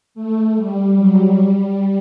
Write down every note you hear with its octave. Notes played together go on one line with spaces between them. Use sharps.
A3
G3
F#3
G3